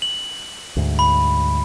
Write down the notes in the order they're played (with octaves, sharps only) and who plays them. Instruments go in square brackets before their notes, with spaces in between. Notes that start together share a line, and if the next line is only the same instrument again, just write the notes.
[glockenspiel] F#7
[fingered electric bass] D2 G#2
[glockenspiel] B5